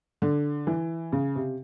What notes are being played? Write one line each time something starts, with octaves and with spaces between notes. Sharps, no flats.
D3
E3
C#3
C3